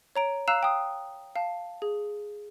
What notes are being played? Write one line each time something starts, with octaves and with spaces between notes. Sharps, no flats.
C#5 A#5 D7
F5 A#5 E6 F#6 C7 E7
G5 D#6
F5 A5
G#4